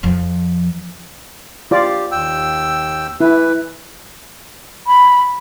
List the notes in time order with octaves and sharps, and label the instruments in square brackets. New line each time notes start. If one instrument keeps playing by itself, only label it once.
[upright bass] F2 F3
[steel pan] F4 D5 [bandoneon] G4
[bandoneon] D#2 G5 E6
[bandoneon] E3 B4 [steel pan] E4
[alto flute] B5